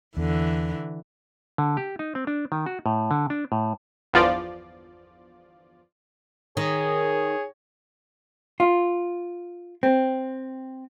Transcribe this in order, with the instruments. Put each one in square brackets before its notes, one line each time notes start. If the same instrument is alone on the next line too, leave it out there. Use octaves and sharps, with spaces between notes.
[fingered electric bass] E2 [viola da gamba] D3 E3
[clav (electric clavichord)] D3
G4
D#4
C4
D4
D#3
F#4
A2
D3
D4
A2
[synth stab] G1 E2 F3 F4 D5
[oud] D#3 [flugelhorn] G#4 [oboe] C#5
[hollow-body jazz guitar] F4
C4